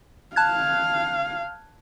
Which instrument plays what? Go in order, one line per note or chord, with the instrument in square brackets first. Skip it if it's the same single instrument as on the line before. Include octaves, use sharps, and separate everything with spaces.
[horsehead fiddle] F5 [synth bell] A5 F#6 G#6